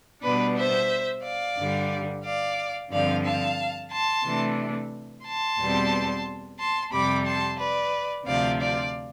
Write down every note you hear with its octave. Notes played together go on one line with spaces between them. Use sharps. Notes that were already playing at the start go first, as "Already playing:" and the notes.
B2 G3 B3 D4 B4 D5
C5 E5
D5 F5
G2 D3 G3
D5 F5
G2 D3 F3 C4 D5 F5
F5 A5
A5 C6
C3 E3 A3 D4
A5 C6
E2 B2 G3 C4
A5 C6
F2 C3 G3 B5 D6
A5 C6
B4 D5
D2 C3 F3 D5 F5
D5 F5